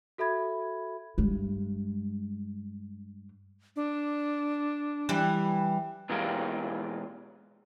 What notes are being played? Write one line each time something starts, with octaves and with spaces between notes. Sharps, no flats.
F#4 A4 E5 B5 G#6
G2 G#3
D4
E3 G3
B2 E3 G#3 A#3 F4 G4